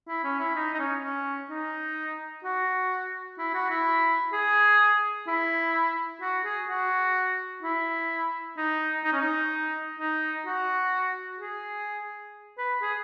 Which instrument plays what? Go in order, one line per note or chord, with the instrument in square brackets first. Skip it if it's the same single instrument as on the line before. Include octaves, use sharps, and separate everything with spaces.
[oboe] E4
C#4
E4
D#4
D#4
C#4
C#4
D#4
F#4
E4
F#4
E4
G#4
E4
F#4
G#4
F#4
E4
D#4
D#4
C#4
D#4
D#4
F#4
G#4
B4
G#4